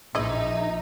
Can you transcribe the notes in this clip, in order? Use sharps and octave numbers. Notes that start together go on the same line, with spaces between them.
A#1 E3 D#4 G#4 D#5 E5